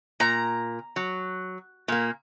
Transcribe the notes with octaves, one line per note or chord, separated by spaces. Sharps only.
A#2 A#5
F#3
A#2 A#3